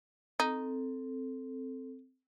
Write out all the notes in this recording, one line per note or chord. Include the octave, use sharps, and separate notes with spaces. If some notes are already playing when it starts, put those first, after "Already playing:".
C4 D#4 A4